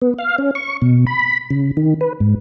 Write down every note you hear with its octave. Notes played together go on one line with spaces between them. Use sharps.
B3
F5
C#4
C#6
B2
B5
C#3
D#3
B4
G#2